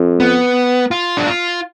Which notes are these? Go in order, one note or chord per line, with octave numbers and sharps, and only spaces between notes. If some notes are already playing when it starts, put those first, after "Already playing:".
Already playing: F2
B3
F4
D4
F4